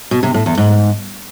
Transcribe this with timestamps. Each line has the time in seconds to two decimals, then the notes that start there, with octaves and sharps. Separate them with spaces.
0.11 B2
0.23 C3
0.34 A2
0.46 E2
0.58 G#2